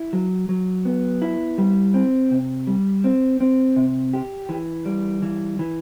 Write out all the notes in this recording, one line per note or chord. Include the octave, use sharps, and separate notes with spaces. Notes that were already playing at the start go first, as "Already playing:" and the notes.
Already playing: E4
F#3
F#3
B3
E4
G3
C4
C3
G3
C4
C4
C3
G4
E3
G3
E3
E3